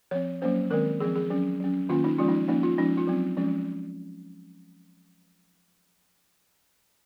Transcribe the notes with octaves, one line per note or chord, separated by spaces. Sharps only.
F3 C4 C#5
F#3 A#3 C#4 C5
D#3 G#3 C4 A#4
F3 C4 G#4
G#4
F#3 C#4
F#3 C#4
D#3 A#3 C#4 F4
D#4
F3 G#3 C#4 F4
D#4
F3 A#3 C#4 D#4
F4
F3 G#3 C#4 D#4
F4
F#3 C4
F3 G#3 C#4